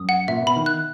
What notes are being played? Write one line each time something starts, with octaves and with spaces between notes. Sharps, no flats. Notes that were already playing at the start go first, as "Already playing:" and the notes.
Already playing: F#2 D#6
F#5
A#2 E5
B2 B5
D#3
F#6